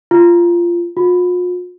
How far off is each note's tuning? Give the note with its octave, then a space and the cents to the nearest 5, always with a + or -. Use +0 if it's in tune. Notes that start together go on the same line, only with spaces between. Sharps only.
F4 -15
F4 +45